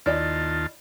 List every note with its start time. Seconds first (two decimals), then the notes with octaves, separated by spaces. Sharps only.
0.06 D#2 E4 F4 D5 D#5 A5